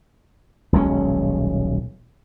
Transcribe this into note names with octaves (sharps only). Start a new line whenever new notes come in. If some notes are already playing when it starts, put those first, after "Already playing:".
D#1 B1 G#3 C#4